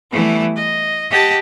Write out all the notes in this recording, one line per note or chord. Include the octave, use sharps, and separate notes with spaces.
E3 G3 A3 B3 E4
D#5
G4 D#5 F#5 A5